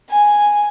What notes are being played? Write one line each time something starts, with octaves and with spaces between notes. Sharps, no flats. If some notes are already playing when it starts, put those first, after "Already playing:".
G#5